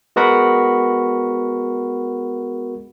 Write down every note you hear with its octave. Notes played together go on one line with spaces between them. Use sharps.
G#3 B3 F#4 A#4 F#5 B5